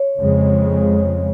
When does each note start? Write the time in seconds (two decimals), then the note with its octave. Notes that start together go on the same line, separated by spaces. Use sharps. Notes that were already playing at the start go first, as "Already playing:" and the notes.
Already playing: C#5
0.17 F2 C#3 G#3